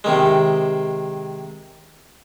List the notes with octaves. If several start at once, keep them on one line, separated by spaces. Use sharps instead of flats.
C3 D#3 G#3